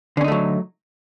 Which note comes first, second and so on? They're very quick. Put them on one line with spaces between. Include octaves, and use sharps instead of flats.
D3 C#4 D#4 A3 F#3